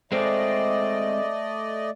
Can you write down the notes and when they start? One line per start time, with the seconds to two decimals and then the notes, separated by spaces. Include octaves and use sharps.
0.12 G#3 A3 C4 D5 D#5